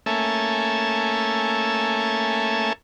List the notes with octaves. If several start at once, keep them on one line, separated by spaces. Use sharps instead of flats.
A3 A#3 C#4 A4 E5 G#5